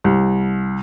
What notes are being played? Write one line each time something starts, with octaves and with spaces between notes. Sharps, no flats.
C2